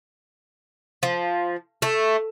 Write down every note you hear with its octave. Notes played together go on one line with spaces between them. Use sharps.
F3
A3